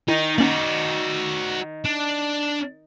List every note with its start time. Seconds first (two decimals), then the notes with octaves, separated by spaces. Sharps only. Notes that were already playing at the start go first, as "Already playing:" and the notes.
0.08 D#3 D#4 E4
0.38 A#3 C#4 D#4 F#4 D5
1.85 D4